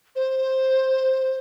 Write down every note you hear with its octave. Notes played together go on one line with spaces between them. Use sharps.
C5